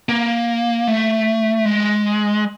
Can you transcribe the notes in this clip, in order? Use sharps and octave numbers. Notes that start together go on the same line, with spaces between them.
A#3
A3
G#3